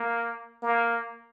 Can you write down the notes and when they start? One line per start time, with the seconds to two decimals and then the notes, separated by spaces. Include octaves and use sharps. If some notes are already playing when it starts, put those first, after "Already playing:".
Already playing: A#3
0.63 A#3